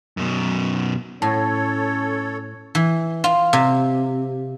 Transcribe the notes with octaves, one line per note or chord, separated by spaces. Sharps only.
F#2 B2
A2 C#4 A4 C#5 A5
E3
F4
C3